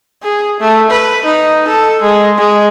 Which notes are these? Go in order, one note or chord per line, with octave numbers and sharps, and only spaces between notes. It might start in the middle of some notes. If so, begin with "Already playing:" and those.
G#4
A3
B4
D#4
A4
G#3
G#3